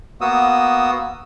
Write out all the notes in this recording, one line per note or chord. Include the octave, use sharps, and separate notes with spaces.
A#3 B3 F#4 D#6 E6